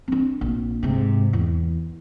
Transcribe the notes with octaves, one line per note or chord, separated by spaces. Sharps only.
C4 D4
A#1
G#2 C3
E2